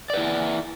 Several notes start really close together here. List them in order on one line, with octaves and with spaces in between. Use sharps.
D5 B4 E4